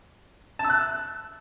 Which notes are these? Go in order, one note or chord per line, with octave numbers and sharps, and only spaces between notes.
A5
E6
F#6